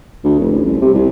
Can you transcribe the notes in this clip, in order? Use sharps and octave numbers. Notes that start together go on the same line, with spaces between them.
D2
F1
A1
C2
C3
C2